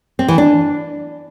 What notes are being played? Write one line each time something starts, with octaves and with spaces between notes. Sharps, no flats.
C4
E3
D4